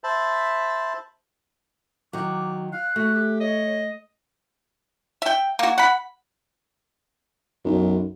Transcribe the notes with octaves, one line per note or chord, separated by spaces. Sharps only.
C5 E5 A5 B5
D#3 F#3 D6
F5 F#6
A3 F#4
G4
C#5 D#5
E5 G5
A#3 F#4
F#5 B5
B1 F#2